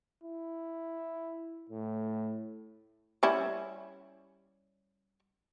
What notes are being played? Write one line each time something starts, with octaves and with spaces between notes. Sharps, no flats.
E4
A2
G3 C#4 E4